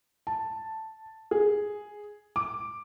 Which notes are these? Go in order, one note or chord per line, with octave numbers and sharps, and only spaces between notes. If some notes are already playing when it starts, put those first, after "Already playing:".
A5
G#4
D6